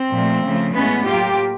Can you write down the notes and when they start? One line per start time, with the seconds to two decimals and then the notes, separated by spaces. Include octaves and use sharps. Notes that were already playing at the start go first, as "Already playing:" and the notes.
Already playing: C4
0.12 A#2 F3 A3
0.43 C#3 F3 A3
0.74 A2 E3 G#3 B3 C#4
1.06 A2 F#3 A#3 F4 G4